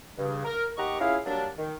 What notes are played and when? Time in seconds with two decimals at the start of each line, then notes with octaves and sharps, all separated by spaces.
0.18 G2 C#3
0.45 A#4
0.77 D#2 G4 D#5 F#5 A#5 C#6
1.00 C#4 E4 F4 G#4 F5
1.26 F#3 G3 A#3 D4
1.57 D#3